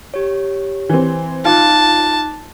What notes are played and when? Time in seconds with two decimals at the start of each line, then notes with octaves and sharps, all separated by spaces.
0.14 G4 C#5
0.89 E3 C4
1.45 D#4 F4 A5 D6 F#6